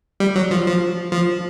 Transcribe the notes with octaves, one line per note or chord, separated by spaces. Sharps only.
G3
F#3
F3
F3
F3